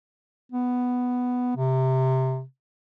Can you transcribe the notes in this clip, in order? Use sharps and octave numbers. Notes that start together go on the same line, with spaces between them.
B3
C3